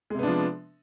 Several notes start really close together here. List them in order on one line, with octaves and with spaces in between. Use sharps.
G#3 C3 B3 D4 F3